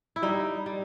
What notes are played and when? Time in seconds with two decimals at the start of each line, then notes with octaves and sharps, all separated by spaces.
0.16 E4
0.22 G3 D#4
0.66 G3